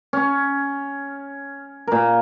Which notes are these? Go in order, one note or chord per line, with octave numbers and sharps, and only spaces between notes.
C#4
A#2 A#4